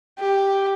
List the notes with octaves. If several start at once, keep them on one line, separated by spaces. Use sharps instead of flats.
G4